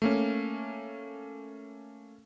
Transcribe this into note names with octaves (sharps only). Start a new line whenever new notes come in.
A3 A#3 C#4